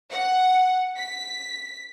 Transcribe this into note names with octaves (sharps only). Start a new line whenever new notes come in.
F#5
B6